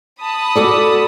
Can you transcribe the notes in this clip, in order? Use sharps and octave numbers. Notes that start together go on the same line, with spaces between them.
A5 B5 D#6
F#4 A4 D5